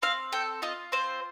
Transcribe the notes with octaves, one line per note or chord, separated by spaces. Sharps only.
C4 F5
A4 G5
F4 D#5
C4 C5